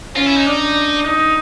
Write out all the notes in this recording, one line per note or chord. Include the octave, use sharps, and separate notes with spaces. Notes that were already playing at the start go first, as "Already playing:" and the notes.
C#4 F4
E4
D#4
D4
D#4